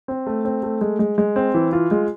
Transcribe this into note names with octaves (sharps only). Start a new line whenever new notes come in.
C4
A3
C4
A3
G#3
G#3
G#3
C4
E3
F4
G#3